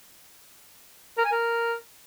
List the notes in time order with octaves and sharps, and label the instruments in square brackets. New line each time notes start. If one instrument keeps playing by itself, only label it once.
[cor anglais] A#4
G#5
A#4